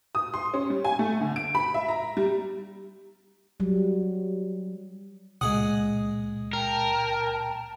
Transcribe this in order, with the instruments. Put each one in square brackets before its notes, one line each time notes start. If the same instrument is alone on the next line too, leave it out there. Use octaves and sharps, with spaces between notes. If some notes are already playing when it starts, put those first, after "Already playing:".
[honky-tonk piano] D#6
C6
C#4
G3
G#5
A3
D3
D7
B5
E5
A#5
G3
[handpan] F#3 G3
[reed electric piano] C#2 A#2 D#6 [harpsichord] G#3 G#4 F#5
[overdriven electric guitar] A#4 [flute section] G5 A5 A#5